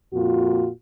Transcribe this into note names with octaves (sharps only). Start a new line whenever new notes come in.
F2 A#2 F4 F#4